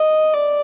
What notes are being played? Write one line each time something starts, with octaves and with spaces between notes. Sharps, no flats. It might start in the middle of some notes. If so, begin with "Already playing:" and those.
Already playing: D#5
D5